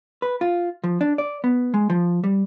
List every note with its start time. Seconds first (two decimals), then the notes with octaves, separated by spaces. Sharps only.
0.22 B4
0.41 F4
0.84 F3
1.01 D4
1.18 D5
1.44 B3
1.74 G#3
1.90 F3
2.24 G3